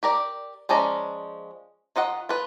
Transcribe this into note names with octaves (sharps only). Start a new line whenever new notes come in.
G4 A#4 D5
F3 G#3 C#4 D5 A#5
D#3 F4 D#5 F#5
F4 B4